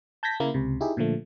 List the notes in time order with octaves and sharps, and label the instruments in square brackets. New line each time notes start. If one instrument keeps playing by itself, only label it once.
[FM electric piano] A5 G6 G#6 A#6 B6
C#3 A#3 E4
C#2 C3
D#4 E4 G4 G#4
A#2 D3 F3 A3